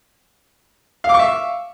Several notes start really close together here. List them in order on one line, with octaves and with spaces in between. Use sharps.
F5 D6 C#6 E5